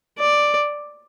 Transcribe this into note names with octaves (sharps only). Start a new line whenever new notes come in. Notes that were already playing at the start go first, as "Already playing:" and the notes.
D5